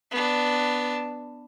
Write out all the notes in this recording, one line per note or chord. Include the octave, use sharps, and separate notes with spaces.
B3 D4